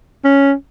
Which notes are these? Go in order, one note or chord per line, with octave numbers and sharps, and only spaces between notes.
C#4